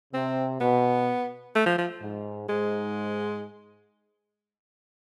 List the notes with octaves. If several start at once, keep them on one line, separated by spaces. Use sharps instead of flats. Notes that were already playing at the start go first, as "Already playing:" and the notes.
C3 C4
B2 B3
A3
F3
F3
G#2
G#2 G#3